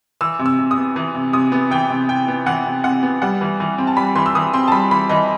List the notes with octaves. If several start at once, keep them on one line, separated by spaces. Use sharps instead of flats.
E3 E6
C3
E6
C3
D#6
B3
E3
C3
C3 D#6
B3
E3 G5
C3
C3 G5
B3
E3 F#5
C3
C3 F#5
B3
G3 F#5
E3
E3
C4
A5
G3 B5
E3 C6
E6
E3 D#6
C4 C6
A5
G3 B5
E3 B5
E3 D#5